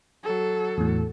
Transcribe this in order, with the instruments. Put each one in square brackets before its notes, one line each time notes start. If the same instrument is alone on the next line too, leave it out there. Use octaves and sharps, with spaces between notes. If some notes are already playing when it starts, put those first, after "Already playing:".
[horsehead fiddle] F#3 A4
[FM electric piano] E2 A2